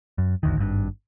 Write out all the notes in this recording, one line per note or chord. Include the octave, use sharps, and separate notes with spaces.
F#2
G1 D2 D#3
G#1 G2